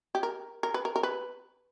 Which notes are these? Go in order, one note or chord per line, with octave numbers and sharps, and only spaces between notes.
G4
A#4
A#4
B4
A#4
A#4
B4